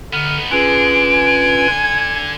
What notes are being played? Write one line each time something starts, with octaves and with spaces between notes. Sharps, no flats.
D3 B3 D#4 F6
D3 C#4 F4 G#4 B4 D7
G#5
G#6